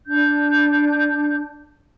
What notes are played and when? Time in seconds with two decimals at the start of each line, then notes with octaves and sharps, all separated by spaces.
0.06 D4 G6